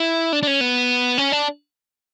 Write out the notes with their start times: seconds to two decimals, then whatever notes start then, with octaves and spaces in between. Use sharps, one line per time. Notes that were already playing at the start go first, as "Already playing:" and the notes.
Already playing: E4
0.33 D4
0.43 D4
0.47 C#4
0.61 B3
1.18 C#4
1.32 D4